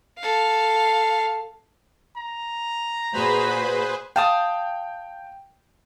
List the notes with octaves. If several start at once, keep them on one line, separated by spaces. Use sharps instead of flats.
A4 F5
A#5
A#2 F#4 G#4 B4 C5 B5
F5 G5 A5 D#6